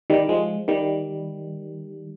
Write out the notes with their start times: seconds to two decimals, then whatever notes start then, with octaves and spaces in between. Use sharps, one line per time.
0.10 D#3 G3
0.29 F3 G#3
0.68 D#3 G3